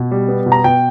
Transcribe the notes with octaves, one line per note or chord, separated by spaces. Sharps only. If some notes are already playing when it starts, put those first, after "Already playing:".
Already playing: B2
G3
B3
B2
A#5
B2 G5